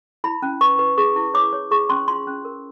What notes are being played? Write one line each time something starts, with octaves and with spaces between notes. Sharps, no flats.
E4 B5
C#4
B4 C#6
B4
G#4 C#6
E4
C#5 D6
C#5
G#4 C#6
C#4 C6
F4 C6
C#4
A#4